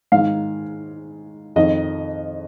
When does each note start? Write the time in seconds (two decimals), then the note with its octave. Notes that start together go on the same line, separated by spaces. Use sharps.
0.12 G#2 D#3 F5
1.56 F2 D#3 D#5